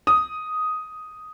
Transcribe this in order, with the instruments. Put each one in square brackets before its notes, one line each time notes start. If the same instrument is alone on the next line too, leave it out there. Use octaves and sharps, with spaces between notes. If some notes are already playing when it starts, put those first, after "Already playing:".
[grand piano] D#6